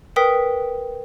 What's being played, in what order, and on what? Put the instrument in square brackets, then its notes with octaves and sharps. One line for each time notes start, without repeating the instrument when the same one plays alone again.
[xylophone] A#4 B4 G5 D#6 B6